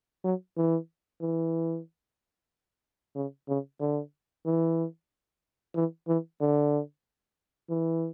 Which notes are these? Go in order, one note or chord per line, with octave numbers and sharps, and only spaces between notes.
F#3
E3
E3
C#3
C#3
D3
E3
E3
E3
D3
E3